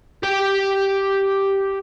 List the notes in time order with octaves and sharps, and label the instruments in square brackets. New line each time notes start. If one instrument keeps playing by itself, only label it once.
[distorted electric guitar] G4 G5